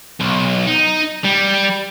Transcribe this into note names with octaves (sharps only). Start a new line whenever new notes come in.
B1
D#4
G3